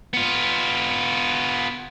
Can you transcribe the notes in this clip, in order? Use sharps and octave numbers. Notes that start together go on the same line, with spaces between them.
B3 F4